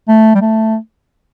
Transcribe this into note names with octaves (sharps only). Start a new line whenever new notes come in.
A3
G3
A3